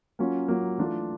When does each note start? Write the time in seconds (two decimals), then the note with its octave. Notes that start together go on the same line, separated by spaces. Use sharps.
0.19 F#3 A#3 C#4 F4
0.48 F#3 A#3 C#4 F4
0.78 E3 A3 D4 F4